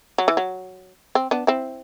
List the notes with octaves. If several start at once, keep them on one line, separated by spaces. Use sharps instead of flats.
F#3
E3
F#3
C4
B3 D4
C4 E4